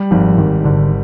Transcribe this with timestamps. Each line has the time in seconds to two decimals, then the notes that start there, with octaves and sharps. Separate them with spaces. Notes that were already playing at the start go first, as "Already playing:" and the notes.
Already playing: G3
0.11 G#1 F3
0.37 G#1 D#3
0.65 G#1 D3